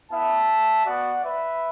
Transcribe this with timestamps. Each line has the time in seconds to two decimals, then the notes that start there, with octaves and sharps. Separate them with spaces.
0.11 B3 E4 E5 A5
0.85 B3 F#4 D5 F#5
1.23 B4 E5